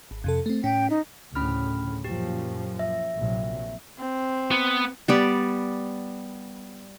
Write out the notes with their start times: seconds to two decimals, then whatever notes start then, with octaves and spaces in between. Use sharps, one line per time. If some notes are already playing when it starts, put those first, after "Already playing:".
0.11 G#1
0.24 F2 C3 A4
0.46 A3 C4
0.64 A2 C#4 G5 B6
0.90 D#4
1.35 D2 A2 C#3 C#4 B5 F6
2.04 F#2 A#2 F3 G4
2.79 E5
3.18 A#1 C3 F#3
3.99 C4
4.51 B3
5.08 G3 B3 D5